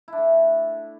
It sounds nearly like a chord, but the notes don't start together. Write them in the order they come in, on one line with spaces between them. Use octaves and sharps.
E4 D4 A3